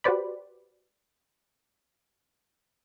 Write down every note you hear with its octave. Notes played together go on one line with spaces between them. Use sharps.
F#4 G4 B4 C5 D5 B5